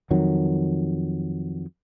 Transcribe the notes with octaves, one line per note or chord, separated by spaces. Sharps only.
F2 D#3 F#3